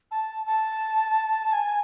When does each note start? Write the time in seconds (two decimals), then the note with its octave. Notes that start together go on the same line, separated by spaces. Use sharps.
0.11 A5
0.47 A5
1.53 G#5